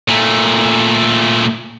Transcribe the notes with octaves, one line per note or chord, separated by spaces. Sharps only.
A#2 A3